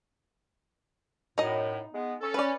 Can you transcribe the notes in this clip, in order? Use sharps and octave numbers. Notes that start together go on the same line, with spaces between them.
F#2 A2 D#4 D#5
G#3 B3
C#4 A4
C#4 B4 D5